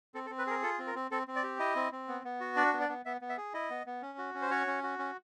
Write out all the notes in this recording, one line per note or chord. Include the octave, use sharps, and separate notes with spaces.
C4 A4
A4
C4
B4
G#4 A#4
F4 A4
C4
A#4
C4
C4 A4
C4
D5
G4
E4 D#5
C4
C4
B3
B3
F#4
D4 D5
B3
D5
B3
B3 E5
B3
E5
G#4
E4 D#5
B3
B3
C#4
F#4
C#4
C5
F#4 C#5
C#4
F#4
C#4